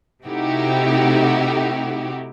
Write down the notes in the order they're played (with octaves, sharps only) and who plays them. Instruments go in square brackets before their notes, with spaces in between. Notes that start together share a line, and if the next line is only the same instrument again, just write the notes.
[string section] C3 A3 D#4 E4 F#4 G4